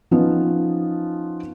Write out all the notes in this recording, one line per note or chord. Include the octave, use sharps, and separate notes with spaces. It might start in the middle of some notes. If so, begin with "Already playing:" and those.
F3 B3 C#4 D#4 F4